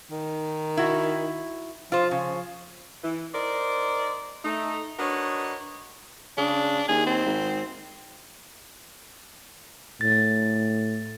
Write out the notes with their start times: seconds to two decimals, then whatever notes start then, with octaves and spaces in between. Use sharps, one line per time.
0.11 D#3
0.77 E4 F#4
1.92 F3 F4 C5
2.11 C#3
3.04 E3
3.34 D#4 A#4 C5 D5
4.45 A3 D#4
4.99 D4 F#4 A#4 B4 C#5 D#5
6.38 C#3 D4
6.88 D#2 G#4
7.06 C4
7.26 G#1
10.01 A2 A6